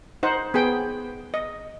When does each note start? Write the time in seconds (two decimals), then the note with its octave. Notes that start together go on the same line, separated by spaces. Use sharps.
0.23 D#4 C5 F#5
0.54 B3 G#4 G5
1.34 D#5